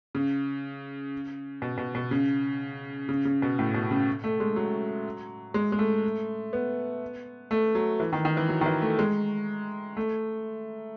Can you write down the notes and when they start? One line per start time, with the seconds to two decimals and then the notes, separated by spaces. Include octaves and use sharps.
0.15 C#3
1.62 B2
1.78 B2
1.95 B2
2.11 C#3
3.09 C#3
3.25 C#3
3.42 B2
3.59 A2
3.74 B2
3.91 C#3
4.24 A3
4.40 G#3
4.56 F#3
5.54 G#3
5.72 G#3
5.79 A3
6.53 B3
7.51 A3
7.75 F#3
8.00 E3
8.13 D#3
8.25 D#3
8.37 E3
8.49 F#3
8.61 D#3
8.66 E3
8.82 A3
8.99 G#3
9.97 A3